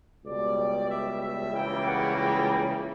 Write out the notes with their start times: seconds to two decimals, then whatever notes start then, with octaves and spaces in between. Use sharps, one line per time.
0.24 C#2 B2 G3 D5
0.88 E5
1.20 E5
1.52 C#2 C#3 E3 G3 A#3 G5
1.84 F#5
2.15 G5